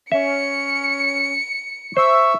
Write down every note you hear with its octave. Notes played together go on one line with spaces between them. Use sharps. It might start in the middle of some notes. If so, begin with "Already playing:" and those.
C#4 E5 C#7
C5 E5 C#6